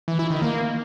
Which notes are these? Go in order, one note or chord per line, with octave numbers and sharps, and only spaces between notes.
E3
E4
D#3
A#3